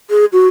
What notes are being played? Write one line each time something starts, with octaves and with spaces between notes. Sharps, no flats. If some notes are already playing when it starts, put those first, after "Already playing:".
G#4
F#4